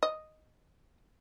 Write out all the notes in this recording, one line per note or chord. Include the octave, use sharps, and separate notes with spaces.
D#5